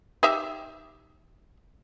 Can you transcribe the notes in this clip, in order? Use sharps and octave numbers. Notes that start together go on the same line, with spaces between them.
D#4 G4 E5